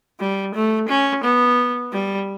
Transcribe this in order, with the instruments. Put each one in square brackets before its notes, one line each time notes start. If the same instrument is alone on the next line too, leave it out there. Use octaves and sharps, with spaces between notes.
[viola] G3
A3
C#4
B3
G3